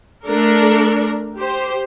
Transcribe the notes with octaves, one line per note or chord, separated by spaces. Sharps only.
A3 D4 A4 A#4
G4 C5